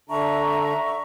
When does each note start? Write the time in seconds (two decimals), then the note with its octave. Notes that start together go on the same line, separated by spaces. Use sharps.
0.09 D3 D4 E5 A#5 C#6